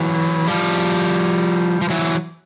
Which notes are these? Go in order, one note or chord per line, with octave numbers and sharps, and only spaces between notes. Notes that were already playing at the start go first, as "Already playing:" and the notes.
Already playing: E3 F#3
F3 G3
F3
E3 F#3